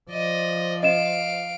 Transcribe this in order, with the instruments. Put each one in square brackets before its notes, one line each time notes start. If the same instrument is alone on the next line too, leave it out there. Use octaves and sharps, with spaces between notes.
[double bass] F3 [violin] D5 D#5
[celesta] D#5 E7 [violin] F5 D7